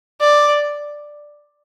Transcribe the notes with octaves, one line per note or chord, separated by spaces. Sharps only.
D5